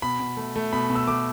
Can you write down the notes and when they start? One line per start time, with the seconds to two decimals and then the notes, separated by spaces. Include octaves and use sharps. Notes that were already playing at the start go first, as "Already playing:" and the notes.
0.02 B2 B5
0.20 B2
0.37 A3
0.56 A3
0.73 B2 B5
0.90 B2
0.95 E6
1.07 A3 D6